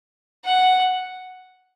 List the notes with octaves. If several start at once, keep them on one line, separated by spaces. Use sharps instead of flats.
F#5